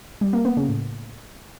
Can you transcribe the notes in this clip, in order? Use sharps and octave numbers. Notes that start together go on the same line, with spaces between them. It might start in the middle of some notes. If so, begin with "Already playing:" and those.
G3
A#3
B3
C#3
A2